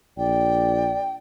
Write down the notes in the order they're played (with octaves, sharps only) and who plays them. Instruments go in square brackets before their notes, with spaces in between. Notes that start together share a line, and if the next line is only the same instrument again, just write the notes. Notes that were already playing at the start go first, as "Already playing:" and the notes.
[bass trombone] A#1 [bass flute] D5 [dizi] G5